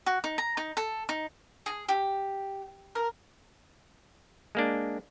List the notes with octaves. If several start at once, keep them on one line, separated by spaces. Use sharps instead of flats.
F#4
D#4
A#5
D#4
A4
D#4
G#4
G4
A#4
G#3 A#3 D4